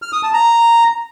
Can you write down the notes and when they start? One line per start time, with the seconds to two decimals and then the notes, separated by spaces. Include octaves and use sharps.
0.02 F6
0.13 D#6
0.23 A5
0.34 A#5